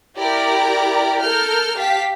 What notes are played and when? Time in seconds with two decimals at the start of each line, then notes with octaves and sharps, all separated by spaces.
0.17 E4 G4 A#4 D5 A#5
1.21 A4 A#4 F6 G6
1.77 G4 F5 A5 B6